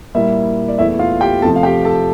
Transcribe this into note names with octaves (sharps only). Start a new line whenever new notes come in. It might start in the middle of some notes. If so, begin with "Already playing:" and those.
A#2 G3 A#3 E4 E5
D5
E2 E3 A3 E4 E5
F4 F5
G4 G5
F2 C3 F3 A3 A4 A5
F5
G4 G5
A4 A5